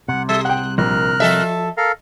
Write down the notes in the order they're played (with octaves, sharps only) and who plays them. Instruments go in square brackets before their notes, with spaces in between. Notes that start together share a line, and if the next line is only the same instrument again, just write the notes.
[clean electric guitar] C2 C3 [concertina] F#5
[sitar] G3 [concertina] A4 E5 A5
[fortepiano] F#5 G5 [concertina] F#6
[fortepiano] A#1 [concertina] A#4 F6 F#6
[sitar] F3 A4 E5 [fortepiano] D#5
[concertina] A4 A#4 F5